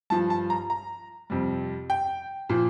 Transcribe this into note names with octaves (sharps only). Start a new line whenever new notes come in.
G2 F3 A5
A5
A#5
A#5
F2 C3 G3
G5
A#2 F3